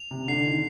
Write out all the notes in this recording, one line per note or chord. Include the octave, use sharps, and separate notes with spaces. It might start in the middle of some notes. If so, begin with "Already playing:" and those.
Already playing: F7
C3
D3 C7
D#3